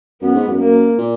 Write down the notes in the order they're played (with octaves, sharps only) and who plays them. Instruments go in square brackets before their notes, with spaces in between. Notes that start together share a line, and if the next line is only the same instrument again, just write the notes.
[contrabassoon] F#2 [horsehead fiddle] B3
[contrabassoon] G#2
F#2
[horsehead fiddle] A#3
[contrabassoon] A#2